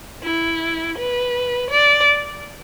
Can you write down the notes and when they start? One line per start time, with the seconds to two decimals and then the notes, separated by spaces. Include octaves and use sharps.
0.23 E4
0.97 B4
1.71 D5